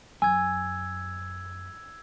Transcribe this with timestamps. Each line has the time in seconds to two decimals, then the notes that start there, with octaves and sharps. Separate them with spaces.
0.22 F#2 G#5 E6 G#6